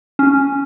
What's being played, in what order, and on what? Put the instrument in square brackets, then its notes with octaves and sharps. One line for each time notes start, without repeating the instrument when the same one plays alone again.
[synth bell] C#4